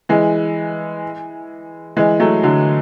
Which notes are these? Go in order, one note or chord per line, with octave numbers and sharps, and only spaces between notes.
E3 G#3
E3 G#3
F#3 A3
D3 F#3